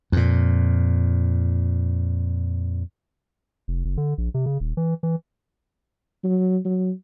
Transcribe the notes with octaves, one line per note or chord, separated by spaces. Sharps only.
F2 A#2
F1
F#1
D3
A#1
C3
C#3
D#1
E3
E3
F#3
F#3